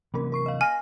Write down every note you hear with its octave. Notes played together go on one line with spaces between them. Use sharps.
C3 E3 F#3 A#3 C#4 A#4
A#4 C#6 C7
D#5 F5
G#5 F6 A#6